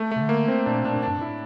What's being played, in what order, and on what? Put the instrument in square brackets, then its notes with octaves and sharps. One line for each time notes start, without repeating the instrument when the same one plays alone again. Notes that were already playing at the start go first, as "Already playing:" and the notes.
Already playing: [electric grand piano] A3
[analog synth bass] C3 [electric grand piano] A3
[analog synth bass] D3
[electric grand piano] A#3
C4
[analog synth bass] A#2 [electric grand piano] D4
[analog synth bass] A#2 [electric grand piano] D4
[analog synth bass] A2
[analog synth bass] G2 [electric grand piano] D4
[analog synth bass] A2 [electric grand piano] E4